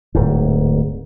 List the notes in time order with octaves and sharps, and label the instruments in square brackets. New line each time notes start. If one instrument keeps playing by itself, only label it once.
[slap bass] D1 G#2